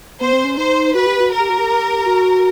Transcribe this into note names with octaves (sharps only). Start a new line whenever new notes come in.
B3 C5
C4
C#4
D#4 C5
F#4 B4
G4
F#4
A#4
G4
F#4
G4
F#4